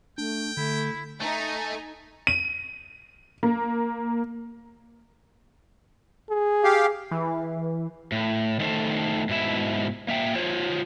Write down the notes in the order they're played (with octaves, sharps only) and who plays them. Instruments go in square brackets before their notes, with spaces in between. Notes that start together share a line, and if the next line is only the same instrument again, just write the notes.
[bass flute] A3 [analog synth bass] D4 [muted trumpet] G5
[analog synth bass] D3 [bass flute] A3 [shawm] E4
[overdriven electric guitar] A3 [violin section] D#4 G#5
[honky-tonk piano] D#7
A#3
[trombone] G#4
[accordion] G4 F5
[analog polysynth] E3
[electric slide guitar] A2
D#3 A3 A4 C5
G#2 B2 E4 E5
A#3 E5 G5
F4 C5 C#5